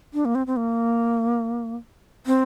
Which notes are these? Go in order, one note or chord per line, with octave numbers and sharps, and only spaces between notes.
D4
A#3
C4
C4
A#3
C4